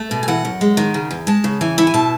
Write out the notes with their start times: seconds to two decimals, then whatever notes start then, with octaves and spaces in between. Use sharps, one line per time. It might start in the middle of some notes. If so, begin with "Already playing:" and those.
Already playing: A3
0.11 B2
0.23 G#5
0.28 E3 F#5
0.45 F#2
0.61 G#3
0.77 D#3
0.94 C#3
1.11 E2
1.27 G#3 A5
1.44 C#3
1.61 E3 G#5
1.78 E4 F#5
1.87 G#5
1.94 B2 A5